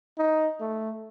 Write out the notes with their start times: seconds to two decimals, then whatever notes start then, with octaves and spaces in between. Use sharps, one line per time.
0.18 D#4
0.60 A3